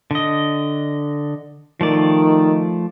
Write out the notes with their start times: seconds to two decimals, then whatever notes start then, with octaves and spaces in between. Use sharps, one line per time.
0.11 D3 D#5
1.81 D#3 F3 A3 D5